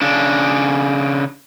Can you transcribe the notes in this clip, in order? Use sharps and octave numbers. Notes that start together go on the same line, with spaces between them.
C#3 D4